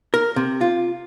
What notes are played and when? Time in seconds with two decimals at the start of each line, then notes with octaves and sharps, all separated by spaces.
0.14 A#4
0.36 C3
0.61 F4